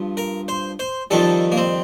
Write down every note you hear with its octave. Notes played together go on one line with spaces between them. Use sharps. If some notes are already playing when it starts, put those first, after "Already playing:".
Already playing: G2 F3
A#4
C5
C5
F2 D#3 G3 A4
A#3
C4